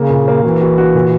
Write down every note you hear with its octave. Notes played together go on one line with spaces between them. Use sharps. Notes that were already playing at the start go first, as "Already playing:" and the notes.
Already playing: C#3 A#3
A#2
A#3
E3 F#4
F#4
F#4
A#2